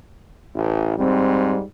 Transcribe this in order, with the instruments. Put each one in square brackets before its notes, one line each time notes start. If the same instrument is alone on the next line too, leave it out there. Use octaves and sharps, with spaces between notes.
[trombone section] A1
[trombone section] G#2 G3 [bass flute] C4